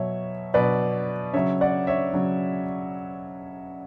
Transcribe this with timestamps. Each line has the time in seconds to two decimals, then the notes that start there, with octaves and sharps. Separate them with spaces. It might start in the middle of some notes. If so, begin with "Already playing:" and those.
Already playing: B2 F#3 C#5 E5
0.54 B2 F#3 B4 D5
1.34 C#3 F#3 C#5 E5
1.61 D5 F#5
1.87 C#5 E5
2.14 C#3 F#3